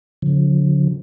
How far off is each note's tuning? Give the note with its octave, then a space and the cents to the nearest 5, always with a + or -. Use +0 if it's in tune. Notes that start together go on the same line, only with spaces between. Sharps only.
D3 -45 F3 +45